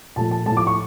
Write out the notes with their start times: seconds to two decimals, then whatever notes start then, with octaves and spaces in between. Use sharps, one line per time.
0.16 A#2 F3 A3 A5
0.31 A5
0.46 A2 F3 A3 A5
0.57 D6
0.67 C#6